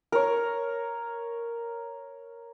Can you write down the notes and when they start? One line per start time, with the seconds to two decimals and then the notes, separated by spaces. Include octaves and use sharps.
0.12 A#4 C#5